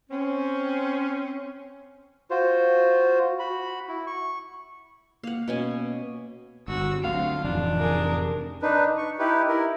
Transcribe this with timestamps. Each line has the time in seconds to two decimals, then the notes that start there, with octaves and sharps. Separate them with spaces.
0.09 C4 C#4
2.30 F4 F#4 C5
3.39 F#4 B5
3.89 E4
4.07 C#6
5.23 A#3 F5 F#5
5.48 B2 C#4 G#5
6.68 G1 F#4 E6
7.04 D2 F#3 C4 F4 F5 F#5
7.44 F1 A2 E3 D4
7.79 G#4 A#4
8.62 D4 D#4 B4
8.97 C#6
9.19 D#4 E4 G4 B4
9.48 E4 A#4